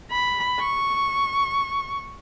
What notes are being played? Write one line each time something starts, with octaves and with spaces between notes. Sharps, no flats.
B5
C#6